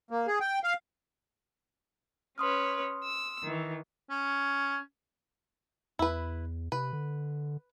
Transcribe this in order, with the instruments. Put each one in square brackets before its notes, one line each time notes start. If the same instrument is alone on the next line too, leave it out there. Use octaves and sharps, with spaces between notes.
[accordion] A#3
G#4
G5
F5
[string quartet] C#4 B4 C#5 [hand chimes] C6 D#6 F6
[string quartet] E6
D#3 E3
[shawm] C#4
[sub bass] E2 [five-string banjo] E4 B4
[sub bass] C3 [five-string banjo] B4
[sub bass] D3